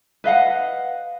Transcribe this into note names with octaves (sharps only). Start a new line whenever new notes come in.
B4 D#5 F5 F#5